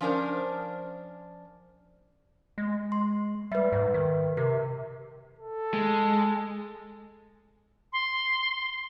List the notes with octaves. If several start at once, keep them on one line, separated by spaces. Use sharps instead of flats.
F3 C#4 D4 A#4 C5
G#3
C6
G3 B4 E5
G#2
D#3
C3 A#4
A4
G#3
C6